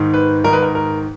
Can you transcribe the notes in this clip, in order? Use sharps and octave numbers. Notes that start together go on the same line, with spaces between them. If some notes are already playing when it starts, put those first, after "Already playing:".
Already playing: G#2 D#3
B4
G#2 D#3 A#4
B4
A#4
A#4